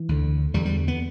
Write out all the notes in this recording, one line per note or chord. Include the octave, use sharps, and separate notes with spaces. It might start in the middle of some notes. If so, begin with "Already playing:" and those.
Already playing: E3
D2 D3
E2 D3 G3
G3
B3